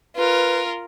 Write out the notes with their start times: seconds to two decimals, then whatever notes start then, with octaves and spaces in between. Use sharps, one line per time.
0.16 F4 A#4 B4